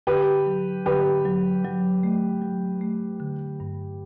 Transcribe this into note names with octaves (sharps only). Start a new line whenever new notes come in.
D3 G4 B4
F#3
D3 G4 B4
F#3
F#3
A3
F#3
A3
D3
G2